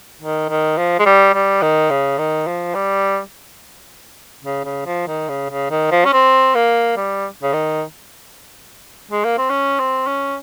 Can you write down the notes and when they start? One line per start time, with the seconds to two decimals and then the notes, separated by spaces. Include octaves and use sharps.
0.21 D#3
0.49 D#3
0.78 F3
0.99 G#3
1.06 G3
1.35 G3
1.62 D#3
1.90 C#3
2.18 D#3
2.47 F3
2.75 G3
4.43 C#3
4.64 C#3
4.86 F3
5.08 D#3
5.29 C#3
5.50 C#3
5.70 D#3
5.91 F3
6.05 C#4
6.13 C4
6.55 A#3
6.97 G3
7.43 C#3
7.53 D#3
9.11 G#3
9.24 A#3
9.38 C4
9.50 C#4
9.79 C4
10.07 C#4